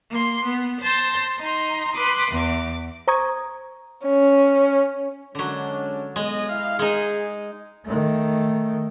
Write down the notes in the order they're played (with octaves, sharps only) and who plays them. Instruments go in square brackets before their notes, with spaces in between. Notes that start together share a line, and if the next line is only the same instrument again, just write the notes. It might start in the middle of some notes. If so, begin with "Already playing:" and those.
[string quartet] A#3 C6
B3
C5 A5 C6 G6 A#6
D#4 A#5 C6
B4 B5 C6 D6 D#6
E2 D6
[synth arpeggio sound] C5 A#5 C#6 D#6 G#6
[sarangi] C#4
[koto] D3 F#3 [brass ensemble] G#3 C#4 D4
[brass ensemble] B1 D#5 [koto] G#3
[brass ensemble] E4 F5
[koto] G#3 D#4 [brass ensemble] G#4
[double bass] D#3 A3